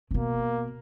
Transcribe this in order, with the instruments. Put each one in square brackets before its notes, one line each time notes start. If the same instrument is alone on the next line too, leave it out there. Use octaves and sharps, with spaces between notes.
[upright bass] C#3
[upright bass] B2 [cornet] A#3